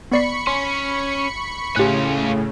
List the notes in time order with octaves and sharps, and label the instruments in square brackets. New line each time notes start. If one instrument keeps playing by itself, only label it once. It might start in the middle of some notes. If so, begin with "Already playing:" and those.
[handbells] B3 D5 C7 [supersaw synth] B5 C#6 C#7
[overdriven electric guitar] C#4 [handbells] C6
[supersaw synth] A2 C#3 [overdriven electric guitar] C#4 F4 [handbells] G4 F#6